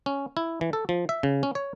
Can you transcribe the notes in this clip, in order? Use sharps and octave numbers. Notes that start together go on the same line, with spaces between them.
C#4
E4
E3
A4
F3
E5
C#3
C#4
C#5